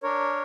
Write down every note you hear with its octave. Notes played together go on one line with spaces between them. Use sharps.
D4 A#4 C#5